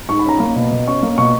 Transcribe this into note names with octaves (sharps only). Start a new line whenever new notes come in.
G#2 C#6
B5
C#4 A#5
A#3 B5
B2
B2
C#4 C#6
A#3
B2 C#6